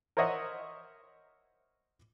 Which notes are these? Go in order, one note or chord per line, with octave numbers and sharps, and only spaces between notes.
A#4 C5 C#5 D#5 E5 F#5